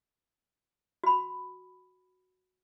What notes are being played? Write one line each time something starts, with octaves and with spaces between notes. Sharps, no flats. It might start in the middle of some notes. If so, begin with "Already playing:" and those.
F#4 B5